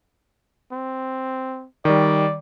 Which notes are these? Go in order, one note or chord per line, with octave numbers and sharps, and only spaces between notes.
C4
D#3 G3 D5